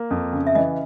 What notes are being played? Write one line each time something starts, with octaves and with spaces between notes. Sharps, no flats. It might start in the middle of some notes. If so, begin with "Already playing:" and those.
Already playing: A#3
F2
C#3
E5
E3 D#5